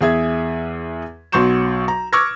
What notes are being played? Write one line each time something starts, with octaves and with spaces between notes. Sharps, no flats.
E2 G#4 E5 G#6
B1 F#3 C6 C#6 G6 E7
A#5
C#6 D6 E6 F6 G#6 A#6